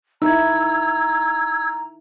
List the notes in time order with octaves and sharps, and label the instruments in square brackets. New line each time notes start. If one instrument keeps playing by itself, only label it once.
[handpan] D#4 E4 [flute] A#5 [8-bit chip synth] E6 G#6